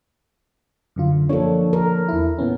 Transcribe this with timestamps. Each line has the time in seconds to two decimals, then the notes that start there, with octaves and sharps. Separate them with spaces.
0.96 F#2 D3 F4
1.29 F3 A#3 D4 A4 C#5
1.73 A#4
2.09 E2 E4
2.38 A#2 B3 C#4